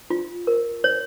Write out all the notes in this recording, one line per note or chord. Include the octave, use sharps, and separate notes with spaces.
F4
A#4
C#5